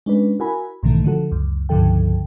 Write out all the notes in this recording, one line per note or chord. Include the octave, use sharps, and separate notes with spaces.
G#3 C#4 D4 B4
E4 F#4 A#4 G#5 B5
B1 G#2 B2 D#3 E3 A3
D3 F3 F#4 A4
C#2 F#2
C#2 G2 D3 F3 A4 G5